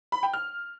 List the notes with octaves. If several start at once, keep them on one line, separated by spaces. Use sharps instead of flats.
B5
G5
F6